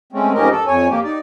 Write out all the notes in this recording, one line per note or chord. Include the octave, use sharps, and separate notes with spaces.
G#3 A3 C4 C#4
F2 G#2 C#4 G4 A#4 D#5
A4
F2 C#5 G#5
A#3 G4
D#4 D5